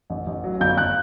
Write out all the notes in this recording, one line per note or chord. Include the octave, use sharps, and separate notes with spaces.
A1
A1
F#3
G1 G6
G1 F#6